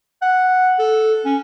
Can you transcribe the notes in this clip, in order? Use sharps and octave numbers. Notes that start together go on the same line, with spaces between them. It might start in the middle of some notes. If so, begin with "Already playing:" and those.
F#5
A4
C#4